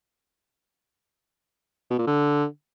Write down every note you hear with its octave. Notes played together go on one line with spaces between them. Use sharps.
B2
A#2
D3